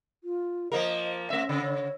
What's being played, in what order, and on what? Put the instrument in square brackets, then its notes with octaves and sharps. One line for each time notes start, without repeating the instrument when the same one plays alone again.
[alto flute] F4
[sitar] F3 A#3 A#4 [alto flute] D#5
[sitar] A3 E5 [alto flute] C#4
[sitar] C#3
[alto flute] C#5